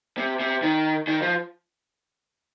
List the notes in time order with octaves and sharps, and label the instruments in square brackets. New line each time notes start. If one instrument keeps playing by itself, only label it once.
[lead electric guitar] C3
C3
D#3
D#3
F3